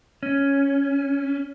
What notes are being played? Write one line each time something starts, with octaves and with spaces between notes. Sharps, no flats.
C#4